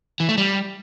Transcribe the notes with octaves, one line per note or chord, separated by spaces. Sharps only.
E3
A3
G3